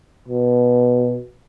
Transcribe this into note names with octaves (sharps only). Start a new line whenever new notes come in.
B2